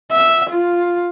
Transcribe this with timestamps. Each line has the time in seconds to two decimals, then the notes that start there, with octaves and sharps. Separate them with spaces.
0.11 E5
0.49 F4